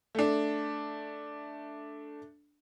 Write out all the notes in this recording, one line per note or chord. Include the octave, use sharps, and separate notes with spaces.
A3 D4